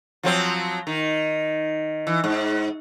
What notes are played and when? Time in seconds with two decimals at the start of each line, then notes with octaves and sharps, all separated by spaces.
0.23 F3 F#3 C4
0.87 D#3
2.07 E3
2.24 G#2